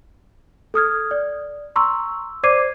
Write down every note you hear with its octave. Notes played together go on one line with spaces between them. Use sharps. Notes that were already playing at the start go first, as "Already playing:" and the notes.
A4 D#6 F6 G#6
D5
A#5 C6 C#6 E6
C5 D5 D6 G#6 C7 D#7